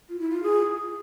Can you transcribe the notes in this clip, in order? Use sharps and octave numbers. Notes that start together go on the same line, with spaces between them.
F4
E4
F4
G#4